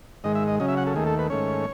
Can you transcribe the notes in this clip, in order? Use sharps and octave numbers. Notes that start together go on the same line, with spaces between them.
G#2 D#3 G#3 D#5
E5
D#5
C#3 F#3 C#4 D#5
E5
F#5
A4
D#2 D#3 A3 G#4
A4
B4
G#2 D#3 A3 C#4 C#5